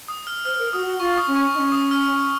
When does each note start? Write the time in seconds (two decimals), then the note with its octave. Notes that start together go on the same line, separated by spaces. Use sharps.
0.08 D#6
0.27 F6
0.45 C5 F6
0.59 A#4
0.73 F#4 D#6
0.86 F#4
0.99 F4 C#6
1.14 C#6
1.17 D#6
1.27 C#4
1.35 C#6
1.54 D#4 C#6
1.59 C#4
1.72 D#6
1.91 F6